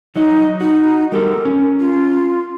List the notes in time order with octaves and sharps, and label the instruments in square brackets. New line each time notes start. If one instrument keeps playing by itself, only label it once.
[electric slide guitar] F#3 F#4 D#5 [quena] D#4
[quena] D#4 [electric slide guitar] F#4
[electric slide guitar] G3 G4 A4 [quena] A#4
[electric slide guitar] C#4
[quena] F4